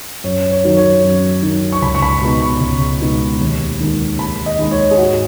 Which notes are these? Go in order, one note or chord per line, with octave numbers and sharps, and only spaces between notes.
F#2 C#5
C#5
D#3 F#3 D#4
C#5
F#2
D#3 F#3 D#4
C#6
C#2 B5
C#6
B5
B2 G#3 B3 D#4
C#6
C#2
B2 G#3 B3 D#4
D#2
D#3 G#3 D#4
D#2 B5
D#5
D#3 G#3 D#4
C#5
G#4
G#2 F#4